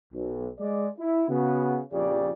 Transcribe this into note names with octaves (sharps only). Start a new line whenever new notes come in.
B1
G#3 D5
E4
C#3 B3 F#4
A#1 F2 C#3 G4 D5